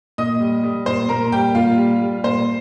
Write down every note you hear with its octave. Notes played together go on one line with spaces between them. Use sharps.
A#2 D#5 D#6
G3
G3
A#2 C5 C6
A#2 A#4 A#5
G3 G4 G5
A#2 F4 F5
G3
G3
A#2 C5 C6